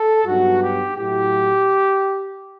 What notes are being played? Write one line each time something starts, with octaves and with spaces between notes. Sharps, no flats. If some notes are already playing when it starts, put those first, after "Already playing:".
Already playing: A4
G2 F#3 B3 D#4 F#4
G4
A2 F#3 A3 E4 G4